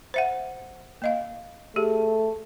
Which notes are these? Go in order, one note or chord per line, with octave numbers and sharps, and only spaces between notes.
C5 E5 F#5
A#3 D#5 F5
A3 G4 G#4